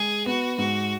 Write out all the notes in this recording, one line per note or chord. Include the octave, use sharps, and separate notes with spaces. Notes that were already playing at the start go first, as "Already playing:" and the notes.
Already playing: G#3 G#4
B3 F#4
G#2 F#4